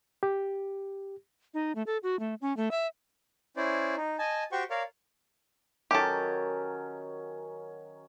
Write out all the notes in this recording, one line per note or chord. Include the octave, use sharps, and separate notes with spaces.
G4
D#4
A3
A4
F#4
A3
C#4
A3
E5
C#4 E4 C5 D5
D#4
D#5 G#5 A5
F#4 G4 C5 G5 C#6
A#4 C#5 D5 F5
D#3 F#3 C#4 G4 A4